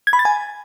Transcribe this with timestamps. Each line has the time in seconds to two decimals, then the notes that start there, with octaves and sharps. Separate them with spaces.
0.07 G#6
0.13 B5
0.19 A6
0.25 G#5